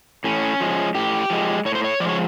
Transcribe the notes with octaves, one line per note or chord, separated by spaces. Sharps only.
A2 C#4
F3 G#3
A2 G4
F3 G#3
A2 C#5
C5
C#5
F3 D5
G#3 C#5